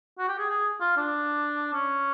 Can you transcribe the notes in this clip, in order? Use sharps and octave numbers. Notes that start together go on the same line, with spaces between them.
F#4
G4
G#4
G#4
F4
D4
C#4